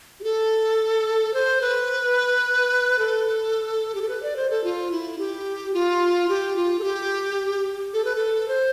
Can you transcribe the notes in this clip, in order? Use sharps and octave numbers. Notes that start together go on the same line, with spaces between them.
G4
A4
C5
B4
A4
G4
A4
B4
D5
C5
A4
F4
E4
G4
F4
G4
F4
A4
G4
A4
B4
A4
C5